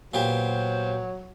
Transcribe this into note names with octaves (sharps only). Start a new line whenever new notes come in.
A#2 F#3 B3 G4 C5